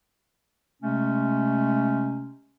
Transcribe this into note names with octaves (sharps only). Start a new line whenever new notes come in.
C3 G#3 A3 C#4